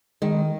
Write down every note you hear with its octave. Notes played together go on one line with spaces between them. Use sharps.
D#3 G#3